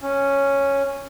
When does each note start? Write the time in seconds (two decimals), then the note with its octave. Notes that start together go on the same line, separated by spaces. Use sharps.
0.01 C#4